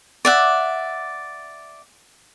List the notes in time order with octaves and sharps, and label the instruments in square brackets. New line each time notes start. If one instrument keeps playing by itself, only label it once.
[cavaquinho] D5 E5 F#5